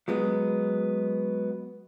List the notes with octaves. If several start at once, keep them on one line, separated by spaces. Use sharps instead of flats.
F#3 G#3 B3